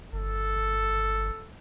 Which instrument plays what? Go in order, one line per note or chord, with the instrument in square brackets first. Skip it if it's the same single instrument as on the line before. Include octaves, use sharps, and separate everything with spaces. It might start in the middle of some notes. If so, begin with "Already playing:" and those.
[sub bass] G1 [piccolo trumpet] A4